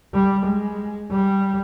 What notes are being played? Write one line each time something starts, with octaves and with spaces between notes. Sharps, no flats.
G3
G#3
G3